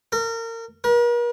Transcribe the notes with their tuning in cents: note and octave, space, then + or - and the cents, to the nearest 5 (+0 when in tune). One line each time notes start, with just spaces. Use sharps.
A#4 -30
A#4 +45